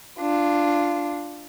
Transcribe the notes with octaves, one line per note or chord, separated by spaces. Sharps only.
D4 F4